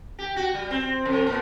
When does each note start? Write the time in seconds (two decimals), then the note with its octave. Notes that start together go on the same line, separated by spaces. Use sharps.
0.19 G4
0.36 F#4
0.54 G3
0.71 C4
1.05 F2
1.27 A#2